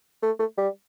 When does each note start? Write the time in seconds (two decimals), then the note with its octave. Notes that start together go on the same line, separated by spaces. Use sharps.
0.22 A3
0.39 A3
0.58 G3